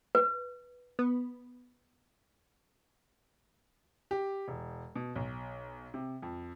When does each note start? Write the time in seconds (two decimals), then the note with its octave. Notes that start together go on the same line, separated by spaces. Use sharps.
0.15 B4
0.99 B3
4.11 G4
4.48 E1
4.96 B2
5.16 B1
5.94 C3
6.22 F2